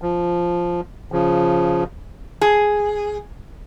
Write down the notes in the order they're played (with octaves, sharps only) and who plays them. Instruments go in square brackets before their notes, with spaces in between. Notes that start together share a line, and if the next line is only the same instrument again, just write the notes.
[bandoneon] F3
C#3 F3
[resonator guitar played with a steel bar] G#4